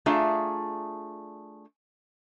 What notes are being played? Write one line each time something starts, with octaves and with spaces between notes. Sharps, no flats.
A3 D4 F4 G#4 E5 A#5